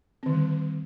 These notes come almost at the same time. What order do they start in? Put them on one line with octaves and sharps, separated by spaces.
C4 D#3 D3 G3